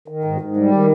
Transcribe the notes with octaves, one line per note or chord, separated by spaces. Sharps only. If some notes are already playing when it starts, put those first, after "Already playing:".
D#3
G#2
G#2
G3
D#3